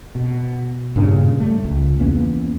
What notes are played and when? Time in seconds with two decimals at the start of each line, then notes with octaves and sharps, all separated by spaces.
0.15 B2
0.96 G2 A#2 C#3
1.40 G3 A3
1.64 C#2
2.00 E2 A#3 B3 C#4